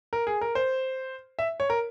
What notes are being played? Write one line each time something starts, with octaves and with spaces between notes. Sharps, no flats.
A#4
G#4
A#4
C5
E5
C#5
A#4